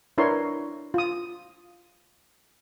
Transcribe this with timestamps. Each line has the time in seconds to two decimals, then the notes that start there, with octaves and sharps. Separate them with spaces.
0.18 D4 E4 A#4 B4 C#5 C6
0.94 F4 D#6